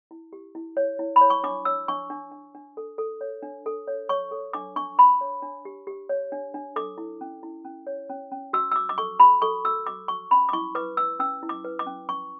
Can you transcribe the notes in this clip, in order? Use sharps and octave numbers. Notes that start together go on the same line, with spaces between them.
E4
G4
E4
C#5
E4
B5
C#5
C#6
D4 D6
C#5 E6
D4 C#6
D4
D4
D4
A4
A4
C#5
D4
A4
C#5
C#5 C#6
A4
D4 D6
D4 C#6
D4 B5
C#5
D4
G4
G4
C#5
D4
D4
A4 D6
E4
C#4
E4
C#4
C#5
C#4
C#4
F#4 E6
E6
F#4 D6
D6
A4 C#6
F#4 B5
A4 C#6
F#4 E6
F#4 D6
F#4 C#6
C#4 B5
D6
E4 C#6
B4 D6
B4 E6
C#4 E6
E4
D6
B4
D6
C#4
C#4 C#6